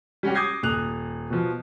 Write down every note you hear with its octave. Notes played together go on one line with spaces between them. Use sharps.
G3 C#4 F#4 G4
D6 D#6 G6 G#6 A#6 C7
D#1 D#6 F#6 F7
B2 F3